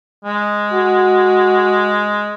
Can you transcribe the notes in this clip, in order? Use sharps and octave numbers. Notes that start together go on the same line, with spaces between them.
G#3
F#4